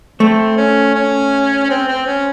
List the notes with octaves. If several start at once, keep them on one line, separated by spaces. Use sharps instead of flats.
A3 C4
C#4
C#4
C#4
C4
C4
C#4